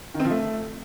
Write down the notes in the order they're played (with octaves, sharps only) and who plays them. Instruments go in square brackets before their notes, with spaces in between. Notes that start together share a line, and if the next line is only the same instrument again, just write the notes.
[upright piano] D#3
C4
F3
A3